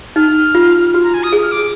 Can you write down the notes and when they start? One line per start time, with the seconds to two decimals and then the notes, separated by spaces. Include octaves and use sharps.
0.16 D#4 F6
0.55 F4
0.94 F#4 F6
1.03 A#5
1.14 G#5
1.23 D#6
1.33 G#4
1.43 F6
1.52 D6